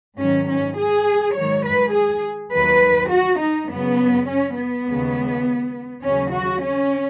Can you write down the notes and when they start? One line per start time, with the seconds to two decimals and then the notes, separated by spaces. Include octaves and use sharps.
0.17 G#2 D#3 F#3 C#4
0.47 C#4
0.75 G#4
1.35 G#2 D#3 F#3 C#5
1.64 B4
1.93 G#4
2.52 D#2 D#3 F#3 B4
3.10 F#4
3.41 D#4
3.69 F#2 C#3 F#3 B3
4.28 C#4
4.57 B3
4.87 D#2 C#3 G#3
6.04 D#2 C#3 F#3 C#4
6.33 F#4
6.64 C#4